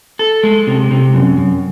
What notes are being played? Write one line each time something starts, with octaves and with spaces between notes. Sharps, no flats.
A4
G#3
C3
C3
F#2
F#2